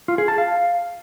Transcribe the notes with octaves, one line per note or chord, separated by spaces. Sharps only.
F4
G#4
A5
F5